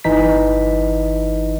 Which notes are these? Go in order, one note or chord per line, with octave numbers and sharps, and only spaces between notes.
G1 E3 D#4 B6